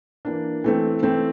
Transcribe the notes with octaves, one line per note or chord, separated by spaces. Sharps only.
E3 A#3 D4
E3 A3 C4
E3 A3 C4